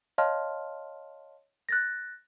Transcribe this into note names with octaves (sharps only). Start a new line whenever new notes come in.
C#5 D#5 F5 A5 C6 F6
F#6 A6 A#6